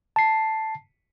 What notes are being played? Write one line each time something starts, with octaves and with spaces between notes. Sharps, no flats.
A5 C7